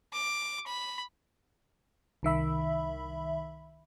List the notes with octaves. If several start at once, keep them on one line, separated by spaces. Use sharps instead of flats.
D6
B5
C2 D#3 E5 B5